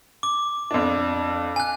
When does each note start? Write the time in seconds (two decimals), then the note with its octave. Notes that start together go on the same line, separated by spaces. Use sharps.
0.23 D6
0.71 F2 D4
1.56 G#5 F#6